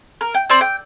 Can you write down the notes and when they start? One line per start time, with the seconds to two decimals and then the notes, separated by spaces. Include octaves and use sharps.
0.21 A#4
0.34 G5
0.50 C4 D5 E6
0.61 G5